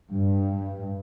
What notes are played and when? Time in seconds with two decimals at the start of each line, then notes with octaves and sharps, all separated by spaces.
0.12 G2